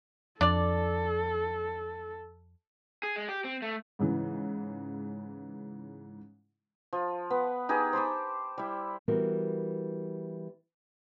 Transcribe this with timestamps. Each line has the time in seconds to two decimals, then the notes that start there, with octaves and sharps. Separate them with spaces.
0.41 F2 D4 A4 D5
3.03 G#4
3.16 G#3
3.29 G4
3.44 C4
3.62 A3
3.99 G#2 C#3 E3
6.93 F3
7.30 B3 B4
7.69 D#4 G4 G#4 B4
7.93 C5 A5 B5 D6
8.58 G3 E4
9.08 E3 G3 B3 F#4 A#4